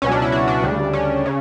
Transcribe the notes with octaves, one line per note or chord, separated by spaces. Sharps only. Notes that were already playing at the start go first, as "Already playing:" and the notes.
C#2 B2 F#3 C#4
D4
E4
F#4
D4
D2 C#3 G3
C#4
C#3